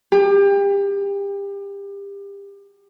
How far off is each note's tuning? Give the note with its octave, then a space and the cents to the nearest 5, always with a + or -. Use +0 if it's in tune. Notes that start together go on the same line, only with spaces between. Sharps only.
G4 +30